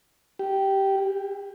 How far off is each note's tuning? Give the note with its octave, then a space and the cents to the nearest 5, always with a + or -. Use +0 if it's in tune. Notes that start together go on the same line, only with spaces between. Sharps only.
G4 -10
G4 +45